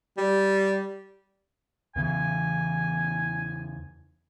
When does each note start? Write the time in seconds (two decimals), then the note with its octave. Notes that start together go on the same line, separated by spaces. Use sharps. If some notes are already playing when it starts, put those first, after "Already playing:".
0.17 G3
1.96 E2 C#3 E3 G#5